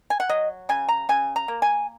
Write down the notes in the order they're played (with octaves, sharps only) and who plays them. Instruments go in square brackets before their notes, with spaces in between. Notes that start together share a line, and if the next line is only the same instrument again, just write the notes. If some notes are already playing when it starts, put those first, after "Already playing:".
[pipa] G#5
F#5
F#3 D#5
C#3 G#5
A#5
C#3 G#5
A#5
A#3
G#5